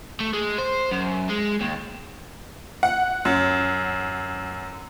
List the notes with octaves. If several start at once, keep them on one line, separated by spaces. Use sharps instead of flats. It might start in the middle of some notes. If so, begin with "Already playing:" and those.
A3
G#3
C5
F#2
G#3
D#2
F#5
F#2